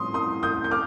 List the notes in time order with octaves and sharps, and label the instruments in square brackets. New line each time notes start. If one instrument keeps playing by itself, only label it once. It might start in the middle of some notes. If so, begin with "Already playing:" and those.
Already playing: [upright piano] A1 A2 C6 D#6
C6 D#6
D#6 G6
G6
D6 F6